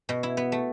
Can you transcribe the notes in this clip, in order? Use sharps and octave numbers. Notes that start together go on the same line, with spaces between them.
B2
E4
B3
A3